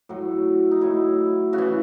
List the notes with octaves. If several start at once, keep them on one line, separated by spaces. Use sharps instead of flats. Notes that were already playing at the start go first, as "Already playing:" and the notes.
A2 F#3 F#4
D#4
A2 F#3 E4
C#3 F#4
E3